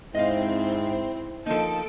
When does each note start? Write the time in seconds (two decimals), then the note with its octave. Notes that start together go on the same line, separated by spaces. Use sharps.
0.14 G#2 C4 E4 D#5 F5
1.46 F3 A#3 D#4 A4 D7